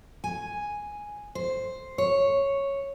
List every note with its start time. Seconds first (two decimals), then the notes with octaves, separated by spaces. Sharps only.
0.24 G#5
1.35 C5
1.98 C#5